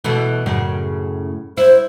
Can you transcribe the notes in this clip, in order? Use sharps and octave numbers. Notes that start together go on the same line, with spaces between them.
B2 E3 A3
F#2 A2 C#3
E4 C5